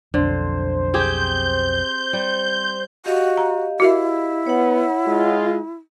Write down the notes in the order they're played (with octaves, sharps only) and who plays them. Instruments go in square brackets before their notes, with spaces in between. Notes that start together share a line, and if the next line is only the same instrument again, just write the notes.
[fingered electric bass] B1 F2 [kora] D3 [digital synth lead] C5
[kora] C4 G4 G#4 [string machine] G6
[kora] G3
[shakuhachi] F#4 [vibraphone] G4 D#5 F5
[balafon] A#5
[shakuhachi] E4 [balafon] F#4 A#4 E5
[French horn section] B3 [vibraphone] C#5 F#5
[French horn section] G#3 F4